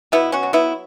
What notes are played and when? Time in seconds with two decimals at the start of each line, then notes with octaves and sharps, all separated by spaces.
0.12 B2 B3 E4
0.32 C#4 F#4
0.43 F#3
0.53 B3 E4